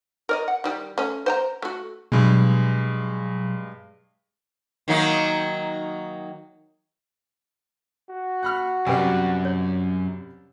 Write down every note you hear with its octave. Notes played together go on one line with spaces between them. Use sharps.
A#4 D5 D#5
F#5
D#3 G3 G4
A3 C#4
C5 G5 A#5
A3 F#4
G2 B2 F#3 G#3
D#3 F#3 A#3
F#4
F#5 B5 F6
C2 F#2 G3 B4 D5 G5 G#5
C#5